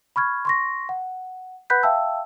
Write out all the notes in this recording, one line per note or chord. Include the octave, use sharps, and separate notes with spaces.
B5 C#6 F6 G#6
C6 C#6 A#6
F#5
B4 F#5 B5 F#6 G6 B6
E5 F5 G5 A5 E6